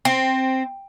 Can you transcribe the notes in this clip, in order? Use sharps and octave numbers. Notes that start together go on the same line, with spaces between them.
C4